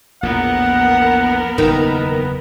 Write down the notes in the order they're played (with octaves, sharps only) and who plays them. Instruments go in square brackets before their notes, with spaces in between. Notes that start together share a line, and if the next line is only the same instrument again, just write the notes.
[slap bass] A#1 E2 A2 [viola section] B3 A#4 [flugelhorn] F#5
[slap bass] F#1 E2 [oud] D#3 [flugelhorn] B4